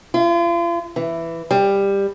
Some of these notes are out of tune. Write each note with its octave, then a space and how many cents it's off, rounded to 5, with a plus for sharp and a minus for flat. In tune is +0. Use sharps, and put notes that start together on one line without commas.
F4 -40
E3 +10
G3 +15